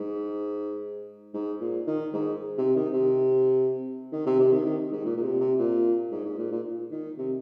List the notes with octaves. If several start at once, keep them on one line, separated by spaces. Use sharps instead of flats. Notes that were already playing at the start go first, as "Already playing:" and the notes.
Already playing: G#2
G#2
A#2
D#3
G#2
C3
D#3
C3
D#3
C3
C3
D#3
D#3
G#2
A#2
A#2
C3
C3
A#2
G#2
G#2
A#2
A#2
D#3
C3